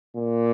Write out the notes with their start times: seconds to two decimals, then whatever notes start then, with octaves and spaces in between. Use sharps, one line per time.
0.17 A#2